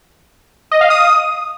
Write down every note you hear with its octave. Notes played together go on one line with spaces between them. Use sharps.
D#5
F5
D#6